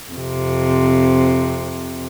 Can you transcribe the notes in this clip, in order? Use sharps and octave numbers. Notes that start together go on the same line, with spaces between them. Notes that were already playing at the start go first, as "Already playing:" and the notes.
F2 C3